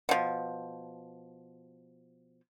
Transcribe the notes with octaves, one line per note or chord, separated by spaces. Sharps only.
B2 F3